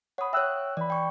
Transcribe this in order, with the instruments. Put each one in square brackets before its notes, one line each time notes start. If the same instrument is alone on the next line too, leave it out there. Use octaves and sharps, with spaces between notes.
[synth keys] C#5 B5 [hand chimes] F#5 D#6
[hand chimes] C#5 E5 [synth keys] G5 E6 F#6
[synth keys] E3 B5 [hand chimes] D5
[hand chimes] G5 C#6